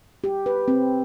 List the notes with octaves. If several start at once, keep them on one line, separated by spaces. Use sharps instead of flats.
G4
B4
C4